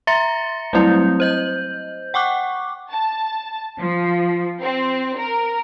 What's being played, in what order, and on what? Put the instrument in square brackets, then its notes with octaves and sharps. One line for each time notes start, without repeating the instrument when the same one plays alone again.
[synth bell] E5 A#5 C6 A6 A#6 C#7
F#3 G3 A3 C4 E4
C5 D#5 G6
F#5 G5 C#6 D6 F#6
[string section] A5
F3
C4
A#4